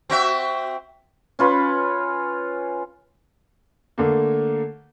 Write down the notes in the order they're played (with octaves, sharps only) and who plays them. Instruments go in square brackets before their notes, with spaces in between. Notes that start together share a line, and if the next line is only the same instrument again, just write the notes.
[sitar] C4 F#4 E5
[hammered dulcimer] C#4 F4 B4
[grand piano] D3 A3 A#3